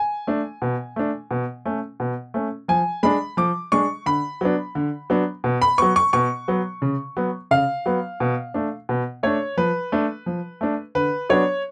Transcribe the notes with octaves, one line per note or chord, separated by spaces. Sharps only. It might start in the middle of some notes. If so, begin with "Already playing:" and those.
Already playing: G#5
A3 D4
B2
A3 D4
B2
A3 C#4
B2
A3 C#4
F3 G#5
G#3 D4 B5
F3 D6
G#3 D4 C#6
D3 B5
F#3 B3 D4
D3
F#3 B3 D4
B2
B5
F#3 B3 C#6
C#6
B2 C#6
F#3 B3
C#3
F#3 B3
C#3 F5
F#3 B3
B2
A3 D4
B2
A3 D4 C#5
F3 B4
A3 D4
F3
A3 D4
D3 B4
F#3 B3 D4 C#5